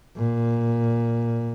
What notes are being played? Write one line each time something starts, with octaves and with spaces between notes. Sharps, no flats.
A#2